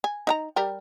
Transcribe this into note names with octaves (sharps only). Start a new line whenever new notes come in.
G#5
D#4 F#5 A#5
G3 A#4 G5